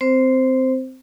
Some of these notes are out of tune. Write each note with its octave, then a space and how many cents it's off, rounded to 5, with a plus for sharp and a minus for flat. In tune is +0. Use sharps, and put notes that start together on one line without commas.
C4 -15 C5 +0